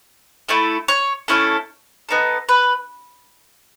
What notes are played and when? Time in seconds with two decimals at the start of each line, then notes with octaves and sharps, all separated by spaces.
0.49 A3 E4 A4
0.88 C#5
1.28 A3 C#4 E4 A4
2.09 B3 D#4 A4
2.49 B4